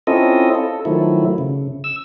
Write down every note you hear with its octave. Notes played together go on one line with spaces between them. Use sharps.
C4 C#4 E4 F4 A4 D#5
A4
D#3 F3 F#3 A3 E4
C#3
E6